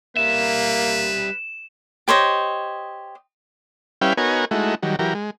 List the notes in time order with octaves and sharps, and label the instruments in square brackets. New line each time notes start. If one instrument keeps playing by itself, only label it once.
[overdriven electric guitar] G3 E5 [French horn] A#3 [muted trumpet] B4 [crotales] E7
[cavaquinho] G4 C5 C#5 D#5
[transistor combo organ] G3 C#4 E4 B4 F5 G5
B3 D#4 F#4 A#4 C#5 G#5
G#3 A3 D#4 E4 F#4
D#3 F#3 G3
E3 F#3 G4 A#4
G#3